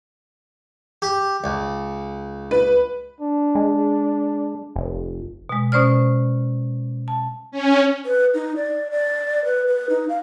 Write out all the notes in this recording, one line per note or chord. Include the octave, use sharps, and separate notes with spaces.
G4
C#2
B4
D4
G#3
F1
B2 G#3
B2 C#4 C5 D5 F6
A5
C#4
B4
D#4
D5
D5
B4
B4
D#4
F5